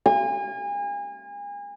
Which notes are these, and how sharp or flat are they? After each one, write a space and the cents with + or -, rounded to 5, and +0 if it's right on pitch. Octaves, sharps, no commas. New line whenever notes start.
G#5 -35